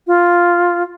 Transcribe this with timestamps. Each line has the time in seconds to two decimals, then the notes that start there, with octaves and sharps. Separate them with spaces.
0.07 F4